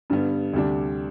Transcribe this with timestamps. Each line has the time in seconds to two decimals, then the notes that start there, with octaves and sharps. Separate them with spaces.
0.10 G2 D3 G3 B3
0.53 D2 C3 G3 D4